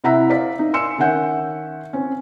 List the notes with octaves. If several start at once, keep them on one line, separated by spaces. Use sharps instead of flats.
C3 E4 F#5 A#5 E6 B6
C5 D5 E5 F5 B6
D#4
G#5 C6 E6 C#7 E7
D#3 C#4 E5 F#5 G6
C4 C#4